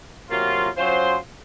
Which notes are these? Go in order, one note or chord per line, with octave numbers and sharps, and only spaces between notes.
C3 F#3 A#3 F4
F#3 C#4 F4 C5